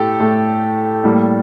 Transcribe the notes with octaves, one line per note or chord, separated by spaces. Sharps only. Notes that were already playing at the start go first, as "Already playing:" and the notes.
Already playing: A2 A3 G4 A4
A2 A3
A2 G3 A#3